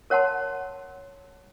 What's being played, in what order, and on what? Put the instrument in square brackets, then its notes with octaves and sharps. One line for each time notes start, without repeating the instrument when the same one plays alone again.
[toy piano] A#4 C#5 F#5 A5 C6